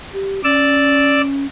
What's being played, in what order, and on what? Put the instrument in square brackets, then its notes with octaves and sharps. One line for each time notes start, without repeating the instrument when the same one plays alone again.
[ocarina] G4
[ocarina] C#4 [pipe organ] D5 E6